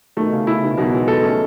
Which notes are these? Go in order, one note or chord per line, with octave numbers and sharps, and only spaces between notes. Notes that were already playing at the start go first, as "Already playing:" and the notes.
B2 D#3 A3
C#3
C#3 E4
B2 D#3
B2 D#3 F#3
E3 G#3
G#3 B3 A4
A3 C#4